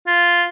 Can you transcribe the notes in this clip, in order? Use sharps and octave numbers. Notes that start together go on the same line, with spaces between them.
F4